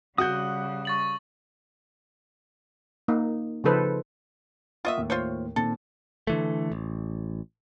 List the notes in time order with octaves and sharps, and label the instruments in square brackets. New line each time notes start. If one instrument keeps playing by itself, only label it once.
[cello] C#3 G3 [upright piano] F#4 F#5 G6 [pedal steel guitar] D#6 F#6
[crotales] C#6 A6 F#7
[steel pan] A#3 D#4
C#3 F3 D#4 A4 B4 C5
[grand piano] A#3 F#5 C#6 [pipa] F4 D#5 E5
[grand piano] D#2 A2
[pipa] F4 C5 C#5
[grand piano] A#2 D#3 C4 [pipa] A4
[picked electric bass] D3 E3 A3
A1